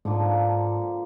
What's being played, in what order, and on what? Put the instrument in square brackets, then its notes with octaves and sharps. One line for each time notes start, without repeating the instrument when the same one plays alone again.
[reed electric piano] G#2 [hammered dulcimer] D3 F3 A#3